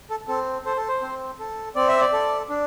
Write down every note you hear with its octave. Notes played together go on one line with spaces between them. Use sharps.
A4
C4 A4
A4 C5
A4
C5
C4
A4
C4 D5
E5
D5
A4
D4